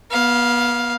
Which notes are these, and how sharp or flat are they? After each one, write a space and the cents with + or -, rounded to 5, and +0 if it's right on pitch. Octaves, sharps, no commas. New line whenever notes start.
B3 -35 F5 +0